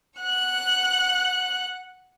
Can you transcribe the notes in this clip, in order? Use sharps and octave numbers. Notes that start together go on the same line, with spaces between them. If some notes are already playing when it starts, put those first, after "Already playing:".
F#5 F#6